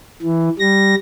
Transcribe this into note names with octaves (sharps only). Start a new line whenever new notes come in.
E3
G3 A#6